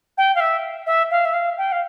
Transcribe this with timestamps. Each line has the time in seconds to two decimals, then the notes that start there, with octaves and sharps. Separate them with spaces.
0.18 G5
0.35 F5
0.40 E5
0.86 E5
1.11 F5
1.25 E5
1.33 F5
1.58 G5
1.72 F5